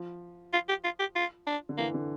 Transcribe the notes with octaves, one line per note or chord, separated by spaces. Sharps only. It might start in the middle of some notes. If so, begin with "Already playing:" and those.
Already playing: F3
F4
G4
F4
G4
F4
D4
D3
E3 A#3
D3